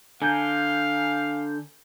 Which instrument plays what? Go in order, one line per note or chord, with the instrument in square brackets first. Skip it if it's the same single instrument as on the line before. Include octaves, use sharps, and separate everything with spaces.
[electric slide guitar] D3 [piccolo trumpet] F5 [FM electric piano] G#5 A#5 G6